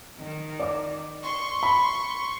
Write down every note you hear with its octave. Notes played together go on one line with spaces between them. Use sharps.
D#3
D5 D6
C6 C#6
B5